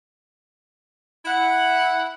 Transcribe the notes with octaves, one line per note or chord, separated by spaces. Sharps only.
E4 F#5